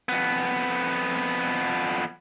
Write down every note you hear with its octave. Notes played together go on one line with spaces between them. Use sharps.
F2 B3